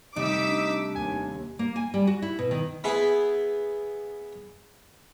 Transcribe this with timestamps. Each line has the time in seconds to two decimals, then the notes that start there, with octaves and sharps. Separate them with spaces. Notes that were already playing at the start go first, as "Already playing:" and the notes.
0.16 C3 G3 A3 D#4 D6 E6 B6
0.49 D4
0.95 D#2 G#5
1.59 A#3
1.76 G#5
1.94 G3
2.07 F#4
2.22 E4
2.39 B2
2.51 D#3
2.84 B3 E4 G#4 B4